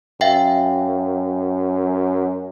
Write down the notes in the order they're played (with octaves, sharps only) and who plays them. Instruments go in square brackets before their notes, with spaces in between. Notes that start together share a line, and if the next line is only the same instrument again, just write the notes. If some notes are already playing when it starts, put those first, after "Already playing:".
[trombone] F#2 [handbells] E5 F5 G5